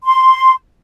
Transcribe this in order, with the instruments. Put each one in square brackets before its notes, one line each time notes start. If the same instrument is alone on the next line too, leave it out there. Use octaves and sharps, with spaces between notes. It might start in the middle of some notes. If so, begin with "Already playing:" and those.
[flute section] C6